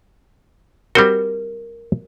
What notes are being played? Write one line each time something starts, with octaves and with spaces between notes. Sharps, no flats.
G3 C4 F#4 A#4